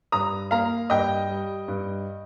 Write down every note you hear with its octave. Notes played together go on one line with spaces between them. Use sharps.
G2 A#5 D#6
A#3 F5 A#5
G2 D#5 G5
G3
G2